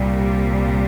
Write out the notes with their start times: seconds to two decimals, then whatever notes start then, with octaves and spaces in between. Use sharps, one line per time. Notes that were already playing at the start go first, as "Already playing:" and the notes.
Already playing: C2 A#2 G3